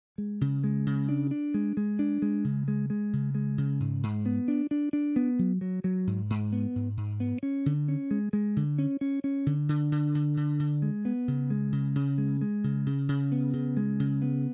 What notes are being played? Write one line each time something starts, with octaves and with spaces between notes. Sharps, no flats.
G#3
C#3
G#3
C#3
D4
D4
G#3
G#3
D4
G#3
C#3
G#3
G#3
C#3
G#3
C#3
G#2
G#2
B3
D4
D4
D4
B3
F#3
F#3
F#3
G#2
G#2
B3
G#2
G#2
B3
C#4
D3
C#4
G#3
G#3
D3
C#4
C#4
C#4
D3
D3
D3
D3
D3
D3
G#3
B3
C#3
G#3
C#3
C#3
G#3
G#3
C#3
C#3
C#3
B3
C#3
G#3
C#3
B3